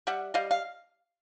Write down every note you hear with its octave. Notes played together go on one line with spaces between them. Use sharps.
G3 E5 F#5
G3 D#5 F5
F5